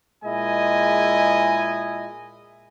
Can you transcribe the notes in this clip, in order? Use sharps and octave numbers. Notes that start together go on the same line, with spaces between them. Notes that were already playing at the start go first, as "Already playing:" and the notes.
A#2 G#3 E4 D#5 G#5